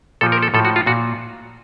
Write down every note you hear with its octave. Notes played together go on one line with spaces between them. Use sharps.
A#2 F3 A4
A#4
A4
A2 F3 A4
F#4
F4
A#2 F#4